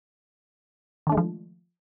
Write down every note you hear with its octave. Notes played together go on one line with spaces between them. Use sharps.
D#3 F3 G#3 A3 D4